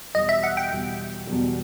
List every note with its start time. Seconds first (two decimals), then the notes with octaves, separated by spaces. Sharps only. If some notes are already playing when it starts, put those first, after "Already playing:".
0.15 E2 B2 G3 D#5
0.29 E5
0.43 F#5
0.57 G5
0.72 E2 B2 G3
1.27 E2 B2 G3